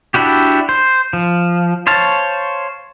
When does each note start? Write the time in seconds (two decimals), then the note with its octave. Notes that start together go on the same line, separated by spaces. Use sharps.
0.14 D4 E4 F#4 G4
0.69 C5
1.13 F3
1.87 C5 C#5 F5 A5